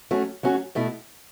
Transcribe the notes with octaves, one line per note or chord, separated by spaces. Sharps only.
F#3 A3 C#4 F#4
F#3 A3 C#4 F#4
B2 A3 E4